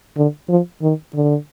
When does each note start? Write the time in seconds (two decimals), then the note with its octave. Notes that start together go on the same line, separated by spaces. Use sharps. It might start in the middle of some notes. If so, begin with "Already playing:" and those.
0.16 D3
0.49 F3
0.82 D#3
1.15 D3